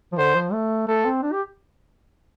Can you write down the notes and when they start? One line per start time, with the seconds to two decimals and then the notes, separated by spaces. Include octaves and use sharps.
0.12 F3
0.18 D3 C5
0.35 F3
0.53 A3
0.88 A3 A4
1.05 C4
1.23 D4
1.33 G4